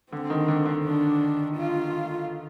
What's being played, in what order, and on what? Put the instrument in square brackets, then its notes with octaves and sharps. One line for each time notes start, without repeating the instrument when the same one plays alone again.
[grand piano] D3 [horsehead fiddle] C4
[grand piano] D#3
D3
D3
[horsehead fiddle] D4
F4